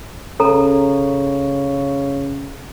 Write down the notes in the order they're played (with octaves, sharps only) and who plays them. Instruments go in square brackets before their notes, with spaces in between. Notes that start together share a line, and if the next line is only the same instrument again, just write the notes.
[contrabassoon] C#3 [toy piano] A4 A#5